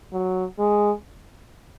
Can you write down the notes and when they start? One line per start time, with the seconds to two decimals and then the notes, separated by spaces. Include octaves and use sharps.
0.12 F#3
0.59 G#3